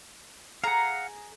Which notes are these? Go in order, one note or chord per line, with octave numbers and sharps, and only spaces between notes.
G#4 F5 F#5 A#5